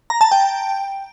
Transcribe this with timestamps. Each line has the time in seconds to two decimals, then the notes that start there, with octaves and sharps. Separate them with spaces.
0.10 A#5
0.21 A5
0.31 G5